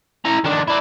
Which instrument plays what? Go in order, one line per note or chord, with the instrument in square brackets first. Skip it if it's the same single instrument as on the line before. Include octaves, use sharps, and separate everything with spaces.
[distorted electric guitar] E4 A#5
D#3 D4
E4 D5